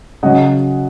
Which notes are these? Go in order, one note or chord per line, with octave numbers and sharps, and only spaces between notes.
C#3 F#3 C#4 D#5 F#5